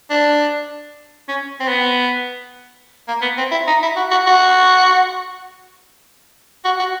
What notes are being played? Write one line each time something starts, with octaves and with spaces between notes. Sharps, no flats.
D4
C#4
C4
B3
A#3
B3
C4
E4
D#4
E4
F#4
F#4
F#4
F#4
F#4